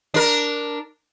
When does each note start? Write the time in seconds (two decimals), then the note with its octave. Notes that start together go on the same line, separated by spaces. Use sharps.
0.14 D4 A#4